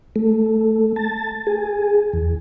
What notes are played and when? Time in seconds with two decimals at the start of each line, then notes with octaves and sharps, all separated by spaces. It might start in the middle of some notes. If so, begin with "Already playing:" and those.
0.16 A3
0.96 A5
1.47 G#4
2.13 E2